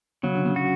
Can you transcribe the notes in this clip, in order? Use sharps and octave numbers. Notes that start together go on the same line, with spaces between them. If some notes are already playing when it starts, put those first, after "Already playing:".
C#3 F#3
D3
C#3
F#4